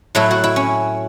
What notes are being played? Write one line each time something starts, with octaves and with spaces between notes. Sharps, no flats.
A2 F#3 A3 E4
F#4
E4
C#4